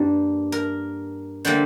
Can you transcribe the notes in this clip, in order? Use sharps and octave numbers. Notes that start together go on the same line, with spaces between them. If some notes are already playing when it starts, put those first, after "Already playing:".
Already playing: G2 G3 A#3
A#4
D3 G3 A#3 C5